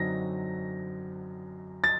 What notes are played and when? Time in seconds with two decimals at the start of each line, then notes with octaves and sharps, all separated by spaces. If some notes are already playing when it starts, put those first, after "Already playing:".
Already playing: F#2 D3 F#3 C4 D#4 A#6
1.84 A6